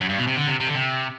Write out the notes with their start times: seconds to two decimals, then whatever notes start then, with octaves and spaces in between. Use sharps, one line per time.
0.01 F#2
0.09 G2
0.18 B2
0.27 C3
0.37 D3
0.48 C3
0.60 C3
0.67 D3
0.75 C3